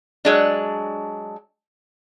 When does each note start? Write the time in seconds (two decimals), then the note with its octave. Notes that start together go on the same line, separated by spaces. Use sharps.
0.25 F#3 G#3 D4